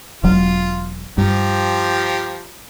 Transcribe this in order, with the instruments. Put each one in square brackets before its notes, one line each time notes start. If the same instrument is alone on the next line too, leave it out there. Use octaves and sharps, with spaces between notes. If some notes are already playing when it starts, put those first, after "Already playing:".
[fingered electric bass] E1 F#3 [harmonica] F4
[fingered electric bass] G2 [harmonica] F3 G4 A#5